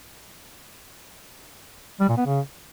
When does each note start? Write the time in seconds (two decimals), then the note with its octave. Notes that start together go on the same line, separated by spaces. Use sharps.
2.01 G3
2.09 A#2
2.18 B3
2.26 C#3